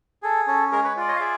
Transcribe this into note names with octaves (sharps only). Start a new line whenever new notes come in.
G#4 A4
C#4 A4
G#3 G#4 A#4
B4 C#5
F4 D5
C#5 D#5
F5
G#4 D5 E5